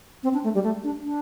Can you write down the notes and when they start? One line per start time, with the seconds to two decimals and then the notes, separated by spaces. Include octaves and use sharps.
0.23 C4
0.34 D4
0.44 A3
0.55 G3
0.64 A3
0.84 D4
1.05 D4